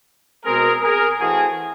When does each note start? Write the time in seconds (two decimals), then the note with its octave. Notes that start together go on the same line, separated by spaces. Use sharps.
0.44 B2 G#3 C4 G#4 A#4
0.82 G#4 A#4
1.20 E3 A3 C4 F#4 G#4